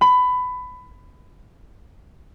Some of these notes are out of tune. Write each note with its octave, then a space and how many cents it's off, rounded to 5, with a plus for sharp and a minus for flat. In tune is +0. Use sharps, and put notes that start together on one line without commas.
B5 +20